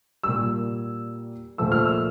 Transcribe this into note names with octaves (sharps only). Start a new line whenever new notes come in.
A#2 G3 E6
A#2 F3 A3 E6
F6
E6